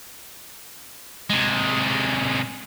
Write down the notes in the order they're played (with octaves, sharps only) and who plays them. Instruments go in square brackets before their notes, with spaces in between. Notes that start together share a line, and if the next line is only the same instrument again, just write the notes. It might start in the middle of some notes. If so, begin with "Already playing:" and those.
[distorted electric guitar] C3 G#3